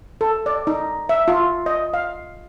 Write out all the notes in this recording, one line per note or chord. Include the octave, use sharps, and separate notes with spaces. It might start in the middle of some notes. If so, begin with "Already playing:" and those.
A4
D5
D#4
E5
F4
D#5
F5